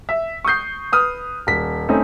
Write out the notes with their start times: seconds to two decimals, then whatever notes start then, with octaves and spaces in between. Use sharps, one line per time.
0.09 E5
0.45 C#6 D#6 G6 C7
0.92 B4 D#6 F6
1.47 D#1 B6
1.89 A3 C4 C#4 D#4